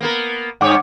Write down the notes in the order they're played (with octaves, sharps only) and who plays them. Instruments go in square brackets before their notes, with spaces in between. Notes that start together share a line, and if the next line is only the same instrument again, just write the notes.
[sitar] A#3 B3 A#4
[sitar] G2 C#5 [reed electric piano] F#5 D6